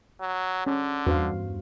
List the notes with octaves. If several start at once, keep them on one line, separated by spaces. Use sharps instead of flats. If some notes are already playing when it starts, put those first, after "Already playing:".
F#3
D3 C#4
E2 G2 F#4 C5 F5